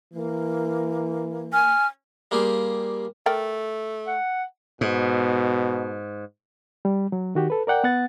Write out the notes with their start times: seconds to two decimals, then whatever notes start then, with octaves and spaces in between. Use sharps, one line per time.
0.14 E3 A#3
1.53 G#5 F6
2.31 G3 A#3 F4 G4 G#4
3.26 A3 A#4 D5 G5
4.07 F#5
4.81 G#2 B2
6.85 G3
7.12 F#3
7.35 D#3 F#4 G4
7.50 A4 B4
7.67 A#4 D5 F#5 G5
7.84 B3 F#5 A6